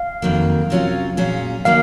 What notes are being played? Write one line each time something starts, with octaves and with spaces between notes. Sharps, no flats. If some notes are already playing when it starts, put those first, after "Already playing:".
Already playing: F5
F2 D#3 F#3 A#3
C3 F#3 C#4 F4
A#2 F#3 C#4 G#4
D#3 F#3 A#3 F5